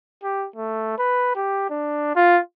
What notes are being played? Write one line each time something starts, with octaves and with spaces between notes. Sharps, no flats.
G4
A3
B4
G4
D4
F4